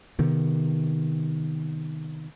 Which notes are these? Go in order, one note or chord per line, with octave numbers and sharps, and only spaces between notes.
C3 D#3 B3